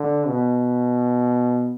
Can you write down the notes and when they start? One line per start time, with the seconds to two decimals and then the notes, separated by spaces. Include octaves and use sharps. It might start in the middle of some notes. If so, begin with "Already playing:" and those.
Already playing: D3
0.28 B2